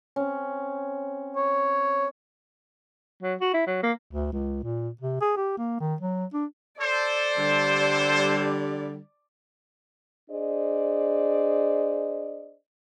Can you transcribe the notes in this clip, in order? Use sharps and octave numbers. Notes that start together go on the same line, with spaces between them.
C4 C#4
C#5
F#3
F#4
E4
F#3
A#3
D2
C#2
A#2
C3
G#4
G4
A#3
D#3
F#3
D4
A4 C5 D5
D3 G3
D4 G#4 C5 D5 D#5